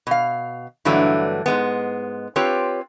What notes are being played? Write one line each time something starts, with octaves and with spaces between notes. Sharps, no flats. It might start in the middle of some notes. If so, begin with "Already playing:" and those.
B2 F5
G2 D3 E3 F#3 A3
G#2 G#3 B3
C4 F4 G4 B4 C#5